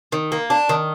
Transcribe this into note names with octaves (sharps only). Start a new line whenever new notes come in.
D#3
A#3
D4
D#3